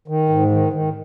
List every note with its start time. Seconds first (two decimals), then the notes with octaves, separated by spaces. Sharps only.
0.08 D#3
0.29 G#2
0.51 D#3
0.73 D#3